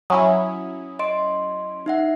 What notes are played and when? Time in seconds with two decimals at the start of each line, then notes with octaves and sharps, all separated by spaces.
0.10 F#3 C#4 E4 D#6
0.99 D#5 C6 D7
1.86 D#4 E5 F#5